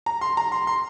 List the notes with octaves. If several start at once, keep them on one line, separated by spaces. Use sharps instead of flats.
A#5
C6
A#5
C6
C6